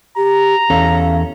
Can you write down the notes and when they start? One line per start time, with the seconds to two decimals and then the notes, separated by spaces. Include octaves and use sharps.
0.17 G4 A#5
0.70 E2 C#4 A4 F5